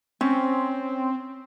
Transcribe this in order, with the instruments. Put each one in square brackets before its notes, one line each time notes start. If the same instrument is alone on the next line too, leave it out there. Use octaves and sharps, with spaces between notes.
[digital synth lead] C4 [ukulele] C#4